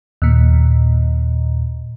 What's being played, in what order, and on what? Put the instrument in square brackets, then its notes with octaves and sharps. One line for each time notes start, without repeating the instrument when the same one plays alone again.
[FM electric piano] D#2 A#2